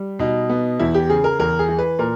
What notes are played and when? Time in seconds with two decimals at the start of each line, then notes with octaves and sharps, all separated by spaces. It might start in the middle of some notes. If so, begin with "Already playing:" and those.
Already playing: G3
0.19 B2 D#4
0.49 B3
0.79 E2 E4
0.94 G4
1.09 C#3 G#4
1.24 A#4
1.39 E2 A#4
1.59 G#4
1.69 E3
1.79 B4
1.99 A#2 A#4